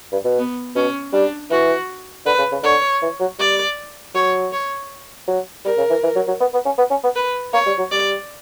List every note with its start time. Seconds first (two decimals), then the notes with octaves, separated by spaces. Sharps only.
0.12 G2
0.25 B2
0.38 B3
0.75 B2 C#4
1.13 G3 D4
1.51 E3 F#4
2.26 D3 B4
2.38 C#3
2.52 C#3
2.63 D3 C#5
3.02 E3
3.20 F#3
3.39 G3 D5
4.14 F#3 C#5
4.52 C#5
5.28 F#3
5.65 G3 A#4
5.78 C#3
5.90 E3
6.03 E3
6.16 F#3
6.28 F#3
6.41 B3
6.54 B3
6.65 C#4
6.78 B3
6.91 C#4
7.04 B3
7.16 B4
7.53 A#3 C#5
7.66 G3
7.78 F#3
7.91 G3 D5